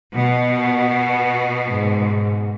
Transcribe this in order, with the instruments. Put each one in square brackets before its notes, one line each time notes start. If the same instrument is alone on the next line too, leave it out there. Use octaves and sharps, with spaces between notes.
[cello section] B2
[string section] G#2